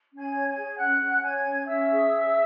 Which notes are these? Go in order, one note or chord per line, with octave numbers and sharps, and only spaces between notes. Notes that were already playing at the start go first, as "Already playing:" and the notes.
C#4
G#5 G#6
C#5
G#5 G#6
G#4
C#4 F#5 F#6
C#4
C#5 G#5 G#6
C#4
C#4 E5 E6
G#4
C#4